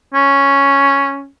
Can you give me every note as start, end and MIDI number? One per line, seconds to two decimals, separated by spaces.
0.14 1.27 61